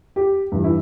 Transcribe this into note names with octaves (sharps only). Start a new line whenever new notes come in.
G4
G2 E3
E4